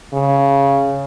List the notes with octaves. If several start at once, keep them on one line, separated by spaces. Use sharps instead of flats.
C#3